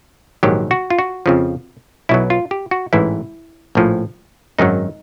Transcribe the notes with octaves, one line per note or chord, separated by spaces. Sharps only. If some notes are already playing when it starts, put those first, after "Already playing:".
A#1 G#2 D#3 F#3 G4
F#4
F4
F#4
F2 C#3 F3
B1 B2 F#3 E4
F4
G4
F#4
A1 G#2 E3 E4
A#1 A2 F3
G#1 F#2 D#3 F#3 D#4